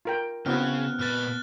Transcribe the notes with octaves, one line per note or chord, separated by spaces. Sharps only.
F4 A#4 G5
C#3 B3 C4 E4 F#4 F6 F#6
A#2 B4 F6 F#6 A6